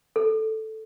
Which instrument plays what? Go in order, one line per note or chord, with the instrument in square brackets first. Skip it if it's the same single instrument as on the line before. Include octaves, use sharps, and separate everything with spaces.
[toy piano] A4